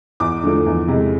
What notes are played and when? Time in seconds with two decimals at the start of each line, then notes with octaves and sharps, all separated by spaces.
0.20 E2 D6
0.43 D3 F3 A3
0.66 E2
0.88 C3 G#3